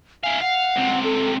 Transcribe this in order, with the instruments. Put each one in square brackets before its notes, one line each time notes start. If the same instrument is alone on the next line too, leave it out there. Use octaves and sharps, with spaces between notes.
[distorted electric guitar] E4 F5 [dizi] G#5
[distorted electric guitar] F5 [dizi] F#5
[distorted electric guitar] C#2 C3
[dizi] A4